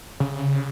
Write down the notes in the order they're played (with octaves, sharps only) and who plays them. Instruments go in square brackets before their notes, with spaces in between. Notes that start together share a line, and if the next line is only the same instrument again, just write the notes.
[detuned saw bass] C#3